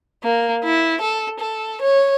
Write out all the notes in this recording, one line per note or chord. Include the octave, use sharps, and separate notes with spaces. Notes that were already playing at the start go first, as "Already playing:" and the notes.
A#3
E4
A4
A4
C#5